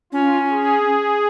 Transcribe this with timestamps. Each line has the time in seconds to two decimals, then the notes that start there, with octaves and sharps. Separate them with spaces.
0.12 C#4 F4
0.49 G#4